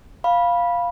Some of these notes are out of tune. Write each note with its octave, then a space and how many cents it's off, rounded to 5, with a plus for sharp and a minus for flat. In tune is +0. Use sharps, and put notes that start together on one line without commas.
F5 +0 B5 -15